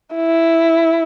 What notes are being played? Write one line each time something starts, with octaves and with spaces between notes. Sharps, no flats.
E4